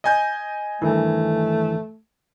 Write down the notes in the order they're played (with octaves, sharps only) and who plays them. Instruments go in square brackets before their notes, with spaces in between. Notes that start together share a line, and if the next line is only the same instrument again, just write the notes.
[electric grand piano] D#5 G#5 G6
[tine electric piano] G2 D#3 E3 [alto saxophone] A3